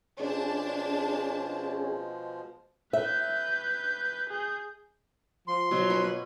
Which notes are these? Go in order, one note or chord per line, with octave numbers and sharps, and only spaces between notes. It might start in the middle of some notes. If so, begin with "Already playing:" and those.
B2 F3 G#3 C#4 D4 G#4 A5
B4 E5 G6
G#4 G6
F3 C6
B2 F3 F#3
B4 C#5
B4 C#5 F#5